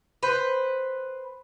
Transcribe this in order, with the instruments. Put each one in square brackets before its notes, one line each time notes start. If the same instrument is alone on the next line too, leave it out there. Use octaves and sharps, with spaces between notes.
[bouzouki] B4 C5